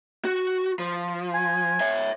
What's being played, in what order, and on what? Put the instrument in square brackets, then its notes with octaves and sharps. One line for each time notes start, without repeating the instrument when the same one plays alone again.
[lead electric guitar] F#4
F3
[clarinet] G#5
[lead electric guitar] C#5 E5